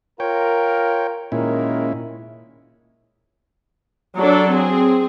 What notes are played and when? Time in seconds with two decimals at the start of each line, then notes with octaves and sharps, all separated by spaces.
0.20 F4 A#4 C#5 G5
1.32 A#2 D#3 G#3 C#4 E4 A#4
4.18 F#3 D4 A4
4.51 C4 G#4